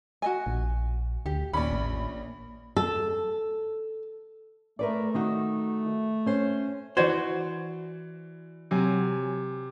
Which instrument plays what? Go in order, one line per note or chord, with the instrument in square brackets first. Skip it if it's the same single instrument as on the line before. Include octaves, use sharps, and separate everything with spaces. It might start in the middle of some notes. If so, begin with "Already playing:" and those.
[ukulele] F#4 D#5 G#5
[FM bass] A#1
[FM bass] D2 [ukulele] G4
[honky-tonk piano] A#1 B5 [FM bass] D#2 [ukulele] C#4 D5
[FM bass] A1
[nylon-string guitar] A4
[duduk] A3 [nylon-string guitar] A#4 B4 D5
[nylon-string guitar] D#3 D#4 F#4
C#4 C5
[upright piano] E3 D5 G#6 [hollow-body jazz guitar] F#4 C5
[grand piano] C3 [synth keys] F#3 G#5